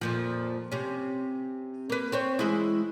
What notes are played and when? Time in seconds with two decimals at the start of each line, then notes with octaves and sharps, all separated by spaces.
0.01 F2 A#2 F3
0.72 C3 C#4
1.90 A#3 B4
2.12 C4 C5 C#5
2.39 E3 G#3 E4